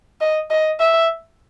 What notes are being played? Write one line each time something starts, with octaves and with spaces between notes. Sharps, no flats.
D#5
D#5
E5